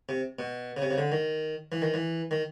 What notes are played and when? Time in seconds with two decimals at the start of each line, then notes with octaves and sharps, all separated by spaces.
0.09 C3
0.39 B2
0.77 C#3
0.82 C3
0.91 C#3
0.98 D3
1.12 D#3
1.72 E3
1.82 D#3
1.94 E3
2.31 D#3